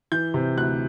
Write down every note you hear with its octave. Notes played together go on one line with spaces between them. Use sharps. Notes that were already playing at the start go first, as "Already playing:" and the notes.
E3 G6
C3
D2 F#6